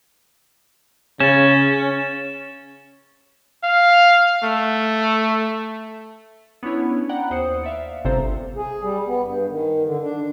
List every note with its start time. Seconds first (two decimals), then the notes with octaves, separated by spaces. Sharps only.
1.20 C#3 C#4 A6 E7
3.63 F5
4.43 A3
6.63 B3 C#4 D4 E4 C#5
7.09 D5 F#5 G5 A#5 B5 F#6
7.30 D#2 C5 D#6 C#7
7.63 D5 E5 F5
8.05 G1 C3 C4 A4 C5 A#5
8.57 G#4
8.83 G3
9.07 B3
9.23 G2
9.49 D#3
9.84 D3
10.03 D4